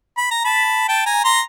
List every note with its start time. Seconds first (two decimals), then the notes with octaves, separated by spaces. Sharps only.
0.17 B5
0.31 A#5
0.45 A5 B5
0.88 G5 A5
1.06 G#5 A#5
1.24 A#5 C6